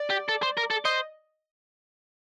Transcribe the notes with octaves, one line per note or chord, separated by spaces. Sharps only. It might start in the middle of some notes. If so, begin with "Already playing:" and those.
Already playing: D5
G4
A4
C5
A#4
A4
C5 D#5